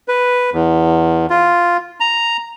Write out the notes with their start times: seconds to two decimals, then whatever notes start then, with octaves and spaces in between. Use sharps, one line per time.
0.08 B4
0.53 E2
1.30 F4
2.00 A#5